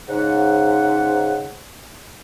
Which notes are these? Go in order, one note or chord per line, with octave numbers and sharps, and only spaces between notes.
G#2 C#3 F#5